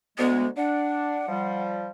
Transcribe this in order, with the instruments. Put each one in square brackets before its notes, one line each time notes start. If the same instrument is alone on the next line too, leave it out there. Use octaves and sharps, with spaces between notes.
[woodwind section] D2 G#3 [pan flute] B3
[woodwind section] D4 [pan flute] F#5
[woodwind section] F3 G3